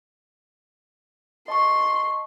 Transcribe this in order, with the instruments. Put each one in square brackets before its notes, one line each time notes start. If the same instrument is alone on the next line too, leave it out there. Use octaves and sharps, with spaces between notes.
[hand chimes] D#5 A5 C#6 [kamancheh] C6